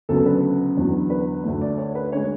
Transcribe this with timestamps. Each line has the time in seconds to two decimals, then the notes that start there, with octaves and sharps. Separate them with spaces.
0.09 D2 C#3 F#3 B3 A4
0.26 B4
0.77 E2 D3 F#3
1.10 B4
1.44 D2 D3 A3
1.61 D5
1.78 C#5
1.95 B4
2.12 D3 G#3 C#5